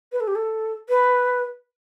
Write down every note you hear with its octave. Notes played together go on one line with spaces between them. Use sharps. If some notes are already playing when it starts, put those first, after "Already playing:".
B4
A4
G4
A4
B4